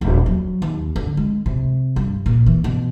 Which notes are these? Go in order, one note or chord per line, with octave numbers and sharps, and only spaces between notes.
D#1
F#3
D#2
D3
G#3
C3
G2
A#2
E3
B2